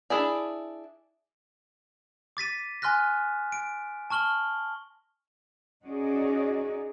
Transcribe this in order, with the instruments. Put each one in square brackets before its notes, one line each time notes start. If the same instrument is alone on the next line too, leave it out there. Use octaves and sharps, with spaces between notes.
[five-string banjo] D4 E4 G#4 D5
[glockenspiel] D6 A6 B6 D#7
G#5 C6 F6 F#6 A#6
D7
A5 C#6 F6 F#7 G7
[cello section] C#4 D#4 F#4 G#4 D5 D#5